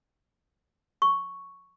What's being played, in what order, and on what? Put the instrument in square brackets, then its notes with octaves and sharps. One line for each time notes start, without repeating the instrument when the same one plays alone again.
[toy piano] C#6